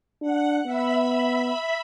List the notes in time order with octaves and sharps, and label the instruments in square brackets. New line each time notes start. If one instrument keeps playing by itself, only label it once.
[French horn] D4 [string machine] F#5
[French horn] B3 [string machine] E5 B5